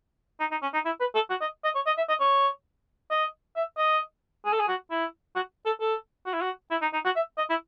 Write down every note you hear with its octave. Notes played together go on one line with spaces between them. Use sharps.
D#4
D#4
C#4
D#4
E4
B4
A4
F#4
D#5
D#5
C#5
D#5
E5
D#5
C#5
D#5
E5
D#5
G#4
A4
G#4
F#4
E4
F#4
A4
A4
F#4
E4
F#4
E4
D#4
D#4
F#4
E5
D#5
E4